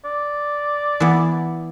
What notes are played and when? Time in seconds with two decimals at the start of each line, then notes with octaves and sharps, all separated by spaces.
0.05 D5
1.00 E3 B3